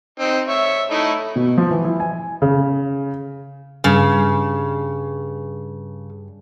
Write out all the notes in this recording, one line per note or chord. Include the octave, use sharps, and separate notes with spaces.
C4 D#4
C#5 E5
A3 D#4 E4
B2
F3
E3
E4
G#5
C#3
G2 C#3